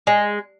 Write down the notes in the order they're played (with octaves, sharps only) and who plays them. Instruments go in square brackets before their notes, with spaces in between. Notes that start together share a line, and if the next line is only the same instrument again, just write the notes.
[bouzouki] G#3